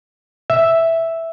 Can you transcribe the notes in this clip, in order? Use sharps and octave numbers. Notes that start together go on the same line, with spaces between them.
E5